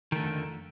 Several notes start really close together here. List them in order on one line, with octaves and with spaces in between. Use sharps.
D#3 A3 D3 F2